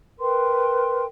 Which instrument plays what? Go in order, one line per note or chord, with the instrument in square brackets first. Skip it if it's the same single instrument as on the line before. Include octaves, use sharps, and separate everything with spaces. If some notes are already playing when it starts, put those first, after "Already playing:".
[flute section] A#4 B4 G5 C6